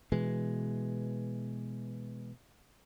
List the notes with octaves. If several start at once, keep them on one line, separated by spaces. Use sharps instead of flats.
B2 E3 G#3